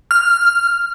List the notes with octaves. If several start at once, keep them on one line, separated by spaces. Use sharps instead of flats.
F6